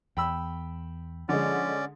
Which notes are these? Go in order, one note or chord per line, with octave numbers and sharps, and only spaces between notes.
E2 G5 B5 E6
D3 F3 G#3 C#4 D5